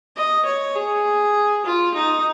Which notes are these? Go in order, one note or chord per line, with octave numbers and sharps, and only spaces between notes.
D#5
C#5
G#4
F4
D#4